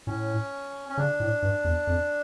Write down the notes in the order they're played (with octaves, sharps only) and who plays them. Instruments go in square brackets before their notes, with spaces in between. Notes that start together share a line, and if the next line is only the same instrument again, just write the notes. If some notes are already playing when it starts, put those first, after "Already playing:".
[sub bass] A2 [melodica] C#4
[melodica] C#4
[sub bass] C#3 [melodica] D4
[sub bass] A2
G2
E2
F2